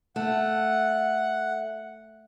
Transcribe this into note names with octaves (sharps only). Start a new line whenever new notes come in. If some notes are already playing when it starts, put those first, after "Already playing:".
A3 F#5